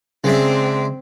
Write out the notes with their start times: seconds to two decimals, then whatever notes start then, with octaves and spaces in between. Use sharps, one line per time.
0.24 C#3 G#3 C4 D4 E5